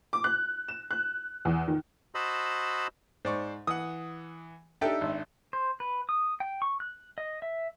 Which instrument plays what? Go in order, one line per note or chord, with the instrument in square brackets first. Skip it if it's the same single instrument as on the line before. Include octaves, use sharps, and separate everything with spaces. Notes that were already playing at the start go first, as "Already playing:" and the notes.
[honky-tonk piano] D6
F#6
E7
F#6
E2
D#3
[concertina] F#4 C5 D#5 A5 B5 E6
[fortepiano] G#2 [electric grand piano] C5 D5 C#6
[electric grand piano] E3 F#5 [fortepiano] D#6
[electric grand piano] D4 D#4 [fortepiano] G4 A4 G5 [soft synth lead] E5
[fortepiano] G#1
[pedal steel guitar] C5
B4
D#6
G5
C#6
F#6
D#5
E5